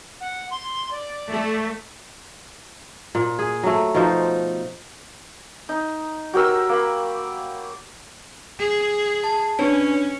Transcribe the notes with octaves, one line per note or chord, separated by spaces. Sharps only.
F#5
C6
D5
A3
A#2
G#4
F#3 A3
B2 F3 D#4 C5
D#4
F#3 G4 A#4 E6
A#3 B5
G#4
A5
C#4 D4 B4 C#5